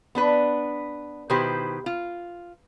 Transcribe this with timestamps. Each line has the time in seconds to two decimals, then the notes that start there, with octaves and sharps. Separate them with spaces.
0.15 B3 D4 B4
1.30 B2 D#3 E4 G4 B4 C5
1.86 F4